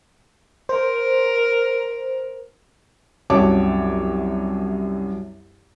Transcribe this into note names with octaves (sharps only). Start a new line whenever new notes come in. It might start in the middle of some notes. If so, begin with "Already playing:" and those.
A#4 C5
C2 F#2 F#3 C#5 A5 D6